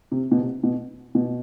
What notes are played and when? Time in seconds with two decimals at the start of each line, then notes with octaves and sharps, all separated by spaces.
0.12 C3
0.32 B2
0.37 C3
0.63 B2
1.15 B2